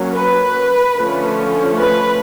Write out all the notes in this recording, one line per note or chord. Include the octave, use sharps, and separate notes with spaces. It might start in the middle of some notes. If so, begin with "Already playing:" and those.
Already playing: F#3 A#3 C#4
B4
D3 F3 A3 C#4
B4